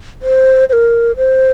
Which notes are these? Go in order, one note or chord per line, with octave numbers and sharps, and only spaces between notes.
C5
C5
A#4
C5